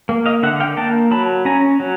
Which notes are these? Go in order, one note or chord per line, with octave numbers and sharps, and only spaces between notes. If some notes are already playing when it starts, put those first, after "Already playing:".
A#3
D#5 F5
D3 E5 F#5
F5 G5
A#3 G5 A5
F#3 A5 B5
C#4 G#5 A#5
F#3